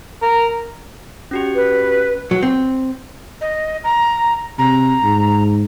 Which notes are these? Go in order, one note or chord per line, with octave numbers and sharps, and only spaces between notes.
A#4
C#4 F#4 G4
B4
F#3
C4
D#5
A#5
C3 A#5
G#2